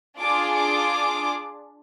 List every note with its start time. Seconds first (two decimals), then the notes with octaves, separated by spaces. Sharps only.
0.19 D4 F4 G#4 D6
0.55 D6